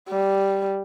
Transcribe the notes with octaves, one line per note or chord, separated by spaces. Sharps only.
G3